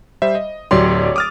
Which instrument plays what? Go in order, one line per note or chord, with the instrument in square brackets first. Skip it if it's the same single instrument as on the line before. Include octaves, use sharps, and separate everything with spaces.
[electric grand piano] G3 C5 E5
D#5
[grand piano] D1 F#3 C6 [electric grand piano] G4 C#5 D5
[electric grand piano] D6 F6 A6 [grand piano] D#6